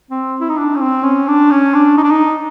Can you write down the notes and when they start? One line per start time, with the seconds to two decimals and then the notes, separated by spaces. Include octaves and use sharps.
0.11 C4
0.40 E4
0.49 D#4
0.58 D4
0.76 C#4
0.81 C4
1.03 C#4
1.28 D4
1.51 C#4
1.74 D4
1.97 D#4
2.04 D4
2.11 D#4